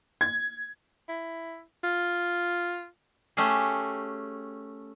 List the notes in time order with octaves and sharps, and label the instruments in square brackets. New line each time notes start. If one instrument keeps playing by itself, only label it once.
[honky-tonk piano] G#6
[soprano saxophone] E4
F4
[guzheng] A3 C#4 G4 G#4